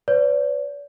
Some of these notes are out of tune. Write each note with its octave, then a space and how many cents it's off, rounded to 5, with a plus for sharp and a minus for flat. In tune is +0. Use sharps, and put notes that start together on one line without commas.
B4 +45 D5 -40